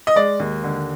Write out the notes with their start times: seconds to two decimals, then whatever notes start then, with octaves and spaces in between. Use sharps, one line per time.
0.07 D#5
0.16 G#3 D5
0.40 D#2
0.64 D3